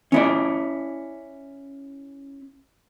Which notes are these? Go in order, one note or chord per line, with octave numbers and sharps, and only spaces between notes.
C#4 E4 D5